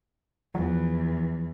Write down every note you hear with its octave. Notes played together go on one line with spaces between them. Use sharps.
E2 F3